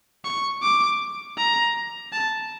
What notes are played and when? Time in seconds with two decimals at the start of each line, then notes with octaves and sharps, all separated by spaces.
0.25 C#6
0.62 D6
1.37 A#5
2.12 A5